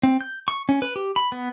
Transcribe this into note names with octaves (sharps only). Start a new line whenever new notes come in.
C4
G6
C#6
C#4
B4
G4
B5
B3